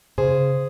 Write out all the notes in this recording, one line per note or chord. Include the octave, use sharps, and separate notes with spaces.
C#3 G#4 C5